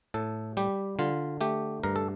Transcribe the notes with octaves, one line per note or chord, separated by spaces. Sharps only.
A2 A4
G3 G4
D3 F4
A3 G4
G2 A#4
A4